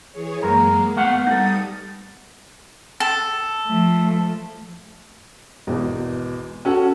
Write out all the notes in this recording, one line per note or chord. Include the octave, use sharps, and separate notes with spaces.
E3 G#4 C#5
F#2 G#3 A#3 A#4
A3 B3 F5 F#5
G3 D#4 A4 D#6
A4
F3 A3
G#1 E2 B2
C#4 F#4 A4 F#5 A5